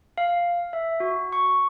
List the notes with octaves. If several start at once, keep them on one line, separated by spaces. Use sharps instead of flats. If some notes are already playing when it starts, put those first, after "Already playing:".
F5
E5
F#4
C#6